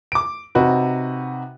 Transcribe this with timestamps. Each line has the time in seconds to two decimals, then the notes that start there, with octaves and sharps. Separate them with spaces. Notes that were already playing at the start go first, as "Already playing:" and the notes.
0.12 D6 D7
0.55 C3 D#4 F#4 B4